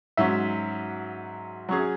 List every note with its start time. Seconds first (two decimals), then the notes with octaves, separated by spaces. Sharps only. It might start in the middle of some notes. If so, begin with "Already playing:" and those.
0.17 G#2 F#3 C#4 E5
1.69 F#3 C#4 G#4